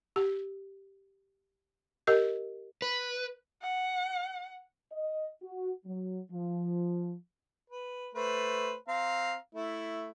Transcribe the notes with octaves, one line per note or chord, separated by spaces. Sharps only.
G4
G4 A#4 D#5
B4
F#5
D#5
F#4
F#3
F3
B4
A3 B4 C5
C4 F5 A#5
A3 E4